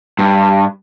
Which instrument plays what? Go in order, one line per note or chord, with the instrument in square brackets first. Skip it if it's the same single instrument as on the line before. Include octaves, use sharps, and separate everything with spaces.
[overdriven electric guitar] G2